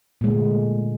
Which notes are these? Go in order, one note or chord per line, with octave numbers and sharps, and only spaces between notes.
A#2 D3 G#3 A3